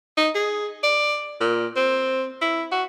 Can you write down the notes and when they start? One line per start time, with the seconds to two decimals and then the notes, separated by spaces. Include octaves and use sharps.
0.17 D#4
0.35 G#4
0.83 D5
1.41 A#2
1.76 C4
2.41 E4
2.72 F#4